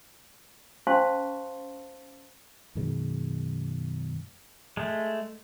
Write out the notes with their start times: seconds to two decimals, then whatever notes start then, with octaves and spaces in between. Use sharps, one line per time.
0.87 C#4 C5 F5 A5 C6 C#6
2.75 F#2 B2 D#3 G#3
4.77 G#3 A3